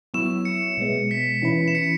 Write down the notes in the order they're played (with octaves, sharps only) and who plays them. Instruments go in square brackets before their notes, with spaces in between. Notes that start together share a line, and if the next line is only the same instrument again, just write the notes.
[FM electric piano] F#3 B3 E4 C#5 E5 [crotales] E7
[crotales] C#7
[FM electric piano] B2 G#3 B3
[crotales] B6
[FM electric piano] E3 C#4 E4 B4
[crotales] E7
C#7